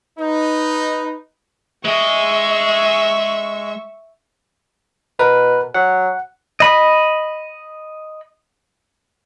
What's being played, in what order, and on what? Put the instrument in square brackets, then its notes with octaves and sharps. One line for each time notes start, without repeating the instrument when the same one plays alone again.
[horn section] D#4 [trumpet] B4
[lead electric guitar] G#3 D#5 [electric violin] E5 C#6
[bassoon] B2 [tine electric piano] A#4 B4
[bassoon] F#3 [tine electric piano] F#5
[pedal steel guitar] D#5 B5